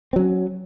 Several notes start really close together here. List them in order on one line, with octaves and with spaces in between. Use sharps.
C4 F#3 C#4